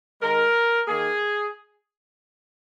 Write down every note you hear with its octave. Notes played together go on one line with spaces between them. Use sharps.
D#3 G#3 A#4
D#3 A#3 G#4